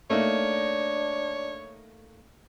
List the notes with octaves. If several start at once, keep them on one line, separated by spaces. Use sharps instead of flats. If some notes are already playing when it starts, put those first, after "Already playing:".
A3 A#3 D4 D#4 C#5